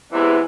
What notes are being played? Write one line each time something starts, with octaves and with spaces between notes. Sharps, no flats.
E2 C3 E3 G#3